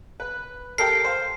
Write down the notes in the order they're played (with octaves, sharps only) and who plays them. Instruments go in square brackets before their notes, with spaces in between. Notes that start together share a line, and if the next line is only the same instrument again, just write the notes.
[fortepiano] B4
[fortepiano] G4 A4 A#4 [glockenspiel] C7
[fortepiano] C5 F5